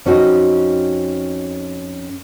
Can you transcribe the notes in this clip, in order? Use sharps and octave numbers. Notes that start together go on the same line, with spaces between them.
F2 C#4 D#4 F#4 D#5